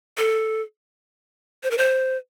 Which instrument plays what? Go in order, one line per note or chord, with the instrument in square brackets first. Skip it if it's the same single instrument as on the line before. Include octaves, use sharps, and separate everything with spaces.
[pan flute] A4
C5
A#4
C5